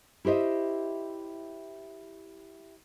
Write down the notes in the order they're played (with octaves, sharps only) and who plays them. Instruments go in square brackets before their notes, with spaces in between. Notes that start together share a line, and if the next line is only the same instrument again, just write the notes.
[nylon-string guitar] E4 G4 C5 D#5 E5